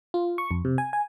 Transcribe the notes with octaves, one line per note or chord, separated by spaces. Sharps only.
F4
C#6
F2
C3
G#5
G#5